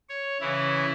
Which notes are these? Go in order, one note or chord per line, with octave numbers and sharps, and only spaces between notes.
C#5
C#3 E3 E4